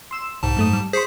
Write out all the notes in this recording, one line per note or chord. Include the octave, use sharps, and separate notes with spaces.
C6 E6 E7
C2 G#2 A5
F#2 A3 D#6
G3
G#4 C5 C6 C#6 B6 C7